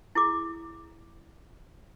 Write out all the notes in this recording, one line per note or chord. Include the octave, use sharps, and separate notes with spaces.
E4 G#4 D6